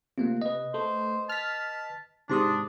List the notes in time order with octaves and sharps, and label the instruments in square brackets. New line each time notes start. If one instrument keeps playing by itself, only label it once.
[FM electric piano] C3 [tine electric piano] A3 A#3 F4
[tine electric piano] B4 D#5
[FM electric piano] A3 [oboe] C5
[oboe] A5 [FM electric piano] F6 B6
[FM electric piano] G#2 C3 [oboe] D4 [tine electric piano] A5 C6 D#6